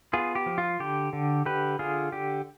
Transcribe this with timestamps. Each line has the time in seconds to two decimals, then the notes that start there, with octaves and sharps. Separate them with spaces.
0.13 B3 F4 G#4
0.35 G4
0.46 F3
0.58 F4
0.80 D3 G4
1.13 D3
1.46 D3 G4 B4
1.79 D3 F4 G#4
2.12 D3 G4